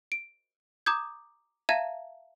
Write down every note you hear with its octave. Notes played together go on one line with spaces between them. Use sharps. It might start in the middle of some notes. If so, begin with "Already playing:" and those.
D7
A#5 D6 D#6 G6 G#6
E5 F5 A5 A#5 G#6 D#7